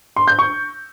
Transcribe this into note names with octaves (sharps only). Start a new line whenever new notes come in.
C6
G6
C#6